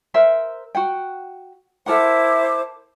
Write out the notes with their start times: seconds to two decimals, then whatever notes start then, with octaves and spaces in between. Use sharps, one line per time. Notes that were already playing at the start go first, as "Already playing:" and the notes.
0.14 A#4 C5 E5
0.75 F#4 F#5 G5
1.86 E4 A4 A#4 C5 F#5 D6